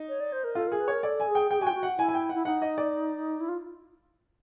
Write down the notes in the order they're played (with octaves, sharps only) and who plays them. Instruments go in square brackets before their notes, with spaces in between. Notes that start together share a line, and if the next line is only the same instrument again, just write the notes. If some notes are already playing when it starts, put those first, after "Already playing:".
Already playing: [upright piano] D#4
[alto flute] C#5
D5
C5
A#4
[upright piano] F4 [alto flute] A4
[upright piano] G#4 [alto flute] A#4
[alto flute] B4
[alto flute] A#4 [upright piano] C#5
[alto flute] A4 [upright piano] D5
[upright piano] G#5
[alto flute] G#4
[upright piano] G5
[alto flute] G#4 [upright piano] G5
[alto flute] G4
[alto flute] F#4 [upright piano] G#5
[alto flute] F4 [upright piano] G5
[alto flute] F#4
[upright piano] F#5
[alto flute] E4 [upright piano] G#5
[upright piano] G#5
G5
F#5
[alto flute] E4
[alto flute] D#4 [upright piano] F#5
[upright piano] D#5
D5
[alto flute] E4
F4